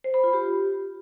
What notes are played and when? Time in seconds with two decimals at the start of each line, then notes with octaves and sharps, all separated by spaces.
0.04 C5
0.14 B5
0.24 F4
0.33 G4